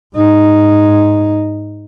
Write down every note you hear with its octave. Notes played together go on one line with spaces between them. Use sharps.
G#2 D#4